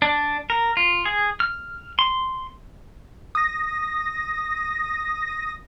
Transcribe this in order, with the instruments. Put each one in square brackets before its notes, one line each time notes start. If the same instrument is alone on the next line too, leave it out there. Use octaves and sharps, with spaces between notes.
[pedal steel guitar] D4
A#4
F4
G#4
F6
C6
[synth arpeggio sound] D#6 A#6